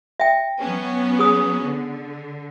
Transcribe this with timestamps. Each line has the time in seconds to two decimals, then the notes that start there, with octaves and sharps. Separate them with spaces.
0.20 E5 G5
0.59 F#3 B3 C#4
1.19 G#4 D#6
1.63 D3